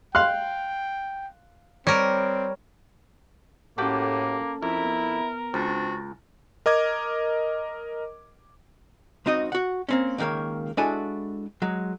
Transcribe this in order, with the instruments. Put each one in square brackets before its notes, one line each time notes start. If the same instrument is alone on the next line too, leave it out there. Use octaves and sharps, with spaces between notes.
[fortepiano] F5 C6 F#6 [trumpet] G5
[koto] G3 A#4 [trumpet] C4 [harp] C#5
[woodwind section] A2 [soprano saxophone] A#3 [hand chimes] C#4 A4 A5 [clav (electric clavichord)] F#4 G4 G5
[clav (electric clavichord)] F2 [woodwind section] E4 [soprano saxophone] A#4
[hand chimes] B3
[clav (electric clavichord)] C#2 [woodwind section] C4 D4 F#4 [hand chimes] A6 A#6
[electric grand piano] A#4 D#5 D6 G#6
[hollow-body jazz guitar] C#2 C4 D#4 F#4 D#5
F#4 F#5
A#3 C4 C#4
C#2 D3 D#3 A#3 C#5
G#3 D4 E4 F#4 A4 G#5
F#3 G#3